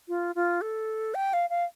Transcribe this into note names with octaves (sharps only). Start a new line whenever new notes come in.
F4
F4
A4
G5
F5
F5